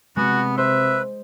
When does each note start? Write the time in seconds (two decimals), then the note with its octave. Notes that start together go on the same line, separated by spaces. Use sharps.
0.16 C3 G#3 B3 F#4
0.58 B4 C5 E5